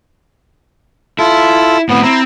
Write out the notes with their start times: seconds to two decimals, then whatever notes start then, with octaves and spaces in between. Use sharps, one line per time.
1.19 E4 F4 A4
1.89 A2 B3 C4
2.03 C4 E4 A#5